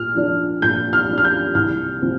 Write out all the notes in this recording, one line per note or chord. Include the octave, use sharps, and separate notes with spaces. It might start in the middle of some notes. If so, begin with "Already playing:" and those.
Already playing: A#2 F6
F3 D4
A#2 G6
F6
F3 D4
F6
G6
C2 F6
C3 F3 C4